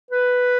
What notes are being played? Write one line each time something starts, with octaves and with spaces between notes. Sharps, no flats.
B4